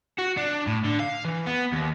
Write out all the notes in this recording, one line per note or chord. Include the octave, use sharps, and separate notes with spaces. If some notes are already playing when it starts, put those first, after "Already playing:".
F#4
D4
A2
D3
F5
E3
B3
D#2